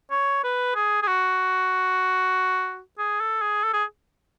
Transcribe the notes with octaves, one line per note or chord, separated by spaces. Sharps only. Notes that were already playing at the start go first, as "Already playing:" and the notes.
C#5
B4
G#4
G#4
F#4
G#4
A4
G#4
A4
G#4